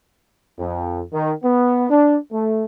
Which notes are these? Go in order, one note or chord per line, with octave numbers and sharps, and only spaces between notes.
F2
D#3
B3
D4
A3